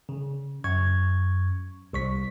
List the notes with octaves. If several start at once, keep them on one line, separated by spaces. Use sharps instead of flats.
C#3
F#2 C#6 G#6
C2 C#6 B6